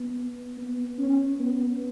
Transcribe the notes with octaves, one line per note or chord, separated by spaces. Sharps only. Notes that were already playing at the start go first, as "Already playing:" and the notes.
Already playing: B3
B3
C#4
B3